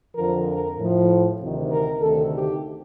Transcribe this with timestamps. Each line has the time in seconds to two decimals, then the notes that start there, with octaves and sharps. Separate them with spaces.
0.15 F2 D3 F3 A#4
0.47 A#4
0.77 A2 F3
1.39 D2 C3 D#3
1.70 A#4
2.00 D2 C3 D#3 A4
2.32 G4